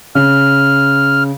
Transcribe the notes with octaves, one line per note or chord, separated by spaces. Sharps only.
C#3 F6